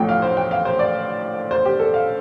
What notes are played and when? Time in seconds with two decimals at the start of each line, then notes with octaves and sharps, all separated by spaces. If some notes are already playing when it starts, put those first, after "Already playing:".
Already playing: A1 A2 F3 A3 G5
0.09 F5
0.22 C5
0.37 G5
0.51 F5
0.65 C5
0.79 D5
1.51 C5
1.65 G4
1.80 A4
1.94 F5